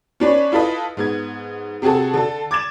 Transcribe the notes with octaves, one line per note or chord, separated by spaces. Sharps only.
C#4 D4 B4 C#5
E4 F4 A4 B4 D#5
G#2 B3 G#6
C3 C4 F#4 G#4 A4
D3 A4
D6 G#6 A6 E7